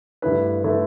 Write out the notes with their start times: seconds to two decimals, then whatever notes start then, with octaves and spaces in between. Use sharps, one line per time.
0.22 G2 D3 A3 E4 B4
0.64 D3 A3 E4 B4